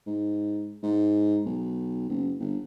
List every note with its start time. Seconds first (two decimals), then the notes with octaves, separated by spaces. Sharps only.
0.07 G#2
0.83 G#2
1.45 B1
2.09 F#1
2.39 G1